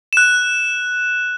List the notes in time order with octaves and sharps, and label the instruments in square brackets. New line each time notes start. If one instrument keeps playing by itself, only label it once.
[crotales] F#6 E7